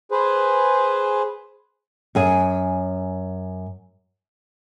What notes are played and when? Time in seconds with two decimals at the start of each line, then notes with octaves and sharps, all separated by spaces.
0.11 G#4 B4 C5
2.15 F#2 G#4 G#5